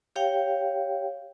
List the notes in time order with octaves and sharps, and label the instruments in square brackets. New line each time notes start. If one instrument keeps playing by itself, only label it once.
[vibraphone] G4 C#5 F5 G5